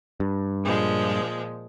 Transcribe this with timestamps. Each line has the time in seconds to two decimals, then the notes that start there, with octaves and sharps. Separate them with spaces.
0.20 G2
0.64 A#2 F3 G#3